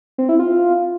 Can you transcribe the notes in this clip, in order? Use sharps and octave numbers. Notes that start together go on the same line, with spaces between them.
C4
E4
F4